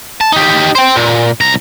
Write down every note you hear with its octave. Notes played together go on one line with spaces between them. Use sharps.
A5
D#4 G4
C5 G5
A#2
C2 A#5